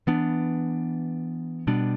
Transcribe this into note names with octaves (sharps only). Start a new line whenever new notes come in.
E3 B3 D4
B2 G3 B3 D4